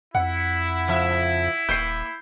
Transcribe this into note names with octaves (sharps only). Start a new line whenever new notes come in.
F2 E4 F#5
C#3 F3 E5
D#1 A#3 G6 C7